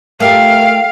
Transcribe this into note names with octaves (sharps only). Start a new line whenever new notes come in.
A3 F4 G4 A#4 F5 G5